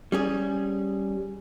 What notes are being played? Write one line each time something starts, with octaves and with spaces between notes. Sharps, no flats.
G3 C#4 G#4